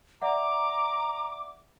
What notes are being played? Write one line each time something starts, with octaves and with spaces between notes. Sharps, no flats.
D5 E5 F#5 A#5 D6